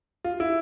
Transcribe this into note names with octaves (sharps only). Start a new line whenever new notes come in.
F4
E4